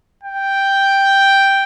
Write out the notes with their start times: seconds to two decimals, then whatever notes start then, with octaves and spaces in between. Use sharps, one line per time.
0.23 G5